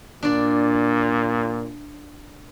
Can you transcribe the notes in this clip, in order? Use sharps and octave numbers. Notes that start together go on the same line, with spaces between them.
A#2 D4 D5